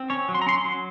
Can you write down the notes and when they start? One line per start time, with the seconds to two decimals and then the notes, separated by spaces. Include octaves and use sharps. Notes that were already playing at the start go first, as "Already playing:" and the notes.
Already playing: C4
0.10 C#4 C#5
0.29 F#3
0.35 C6
0.42 A#5
0.46 C#4 C6
0.58 C6
0.65 F#3